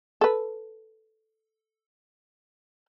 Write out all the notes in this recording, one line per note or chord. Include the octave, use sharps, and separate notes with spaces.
A4 B4